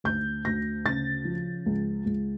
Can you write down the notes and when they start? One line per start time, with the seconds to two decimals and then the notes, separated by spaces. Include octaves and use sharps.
0.04 D2 G6
0.45 D2 A#6
0.85 C#3 A6
1.25 F3
1.66 C#2
2.05 C#2